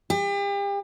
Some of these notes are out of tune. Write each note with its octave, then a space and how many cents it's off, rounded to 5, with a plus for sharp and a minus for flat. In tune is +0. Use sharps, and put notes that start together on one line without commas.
G4 +40